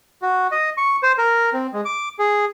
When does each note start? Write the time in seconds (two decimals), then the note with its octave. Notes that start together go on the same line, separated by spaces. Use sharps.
0.22 F#4
0.52 D#5
0.77 C#6
1.03 C5
1.18 A#4
1.53 C4
1.73 G#3
1.85 D6
2.19 G#4